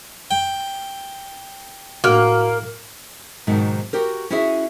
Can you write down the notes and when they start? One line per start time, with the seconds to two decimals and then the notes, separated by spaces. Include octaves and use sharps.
0.31 G5
2.04 A2 A#3 F#4 F6
3.47 G#2 B2 D#3 F#3
3.93 F#4 G4 A#4
4.30 C#4 E4 F#4 G#4 E5